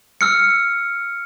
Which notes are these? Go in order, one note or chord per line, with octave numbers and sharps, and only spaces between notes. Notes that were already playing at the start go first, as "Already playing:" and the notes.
E6 F6 C#7